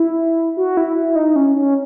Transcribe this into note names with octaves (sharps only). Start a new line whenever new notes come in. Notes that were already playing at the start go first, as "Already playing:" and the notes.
Already playing: E4
F#4
E4
E4
D#4
C#4
C#4